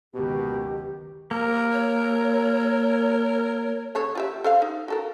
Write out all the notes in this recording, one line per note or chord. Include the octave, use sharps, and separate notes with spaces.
F#1 C#2 B2 D#3 G4
A#3 A#4
C#5
C#3 A4 C#5
F4 G4 E5
A4 C5 F5
D#4
F#4 A4 A#4